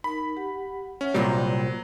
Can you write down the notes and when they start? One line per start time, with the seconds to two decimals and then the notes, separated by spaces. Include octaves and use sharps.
0.04 D#4 A#4 B5
0.37 G4 F#5
1.01 C#4 C#5 E5 F#5
1.14 C2 A#2 F#3 G3 C5 G5 B5